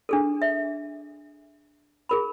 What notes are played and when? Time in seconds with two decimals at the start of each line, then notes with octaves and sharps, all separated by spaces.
0.09 D4 G#4 A4
0.42 E5
2.09 G#4 A#4 B5